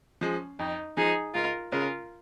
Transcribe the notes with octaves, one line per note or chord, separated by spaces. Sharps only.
F3 G#3 C#4
F2 D#4
F3 G#3 D#4 G#4
C#2 F4 A#4
C#3 G#3 C#4 F4 A#4